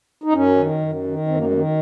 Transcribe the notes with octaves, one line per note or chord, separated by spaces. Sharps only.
D#4
F#2 C#4
D#3
F#2
D#3
F#2 C4
A#3
G#3
D#3 A#3